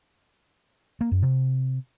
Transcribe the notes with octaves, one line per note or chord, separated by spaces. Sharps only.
A#3
F#2
C3